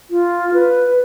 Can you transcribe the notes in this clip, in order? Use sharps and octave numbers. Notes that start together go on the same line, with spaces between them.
F4
B4